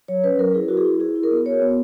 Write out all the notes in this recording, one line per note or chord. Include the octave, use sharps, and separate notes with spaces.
F#3 C#5
C#4 B4
F#3 A#4
E4 G#4
E4 F#4
G#4
E4
E4 G#4
E4
A#4
B3
F#4 C#5
B3